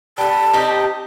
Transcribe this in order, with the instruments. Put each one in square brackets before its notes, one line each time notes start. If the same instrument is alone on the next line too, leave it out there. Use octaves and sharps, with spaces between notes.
[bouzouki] G3 B3 [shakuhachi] A5
[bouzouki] C4 D#4 G4